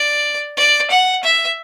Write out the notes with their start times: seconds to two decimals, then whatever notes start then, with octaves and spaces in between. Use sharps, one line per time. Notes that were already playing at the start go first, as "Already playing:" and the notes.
Already playing: D5
0.57 D5
0.91 F#5
1.23 E5